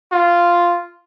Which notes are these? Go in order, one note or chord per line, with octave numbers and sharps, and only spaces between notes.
F4